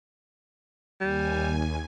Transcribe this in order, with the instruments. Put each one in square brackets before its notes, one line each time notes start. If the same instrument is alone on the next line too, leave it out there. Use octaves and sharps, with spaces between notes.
[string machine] D#2 G#5 [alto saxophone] G3